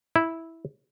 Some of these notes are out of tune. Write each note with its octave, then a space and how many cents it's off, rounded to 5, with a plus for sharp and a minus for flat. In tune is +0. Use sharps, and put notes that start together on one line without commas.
E4 -10